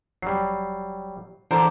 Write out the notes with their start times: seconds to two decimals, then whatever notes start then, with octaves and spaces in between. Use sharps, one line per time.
0.22 F1 F#3 G3 C7
1.51 D3 E3 A#4 C5 A5 D6